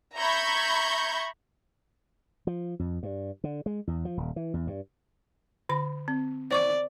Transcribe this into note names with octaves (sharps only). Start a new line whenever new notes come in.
E5 A#5 B5 C#6 G6 G#6
F3
F2
G2
D3
G#3
E2
F3
D#1
E3
E2
G2
D3 B5
C4
C5 D5 C#6 D6